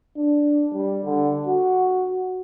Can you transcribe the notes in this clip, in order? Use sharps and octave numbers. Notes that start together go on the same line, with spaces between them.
D4
G3
D3
F#4